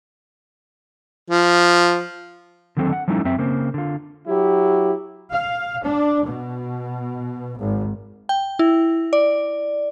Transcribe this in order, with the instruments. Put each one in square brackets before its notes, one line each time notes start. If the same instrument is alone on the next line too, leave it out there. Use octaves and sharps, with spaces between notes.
[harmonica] F3
[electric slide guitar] D3 D#3 F#3 C4 F#4 A4
F#5
F3 G3 A3 C#4 D#4 E4
F#2 C4 E5
C#3 A#3 C4
D3 F4
[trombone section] F#3 E4 G4
[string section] F5
D4
B2
G#1
[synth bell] G5
E4
D5